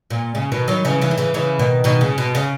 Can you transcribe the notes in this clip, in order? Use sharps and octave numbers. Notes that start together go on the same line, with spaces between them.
A#2
C#3
B2 D#3
D#3 F#3
C#3 E3
C#3 E3
D#3
C#3 E3
C#3 E3
B2 D#3
B2 D#3
C#3
B2
C#3